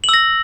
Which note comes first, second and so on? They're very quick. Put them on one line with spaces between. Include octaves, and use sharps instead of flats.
F#7 E6 A#6